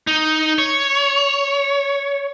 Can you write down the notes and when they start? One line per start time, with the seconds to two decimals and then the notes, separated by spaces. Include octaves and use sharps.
0.07 D#4
0.58 C#5